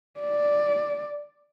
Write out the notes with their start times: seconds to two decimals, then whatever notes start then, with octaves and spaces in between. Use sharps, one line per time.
0.20 D5